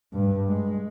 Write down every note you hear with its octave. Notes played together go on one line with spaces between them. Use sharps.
G2
G#3